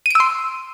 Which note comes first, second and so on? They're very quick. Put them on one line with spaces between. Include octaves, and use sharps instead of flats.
D#7 D7 E6 C6